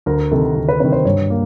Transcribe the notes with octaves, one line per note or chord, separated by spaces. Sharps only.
D2 A#4
C3 D#3 A4
D2
B4
C3 D#3 B4
C5
G2 C#5
A#3